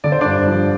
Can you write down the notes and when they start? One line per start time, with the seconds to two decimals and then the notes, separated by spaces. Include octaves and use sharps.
0.04 D3 D5
0.12 C5
0.21 G2 D4 D5
0.47 F3